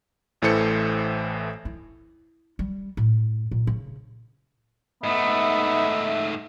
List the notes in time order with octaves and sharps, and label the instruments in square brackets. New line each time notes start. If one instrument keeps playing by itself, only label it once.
[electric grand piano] A1 A2 E3 A4 C5 C#7
[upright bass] E4
G3
A2
A#2
C#3
[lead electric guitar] G#2 A3 [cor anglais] B3 [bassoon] D#4 [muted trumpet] E5